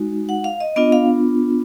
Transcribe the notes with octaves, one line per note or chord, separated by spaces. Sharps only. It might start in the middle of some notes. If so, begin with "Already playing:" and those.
Already playing: G#3 D#4 F#4
F#5
F5
D#5
B3 D4 F4 D#5
F5